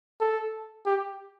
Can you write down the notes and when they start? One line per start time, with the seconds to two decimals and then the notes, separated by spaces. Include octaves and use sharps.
0.20 A4
0.85 G4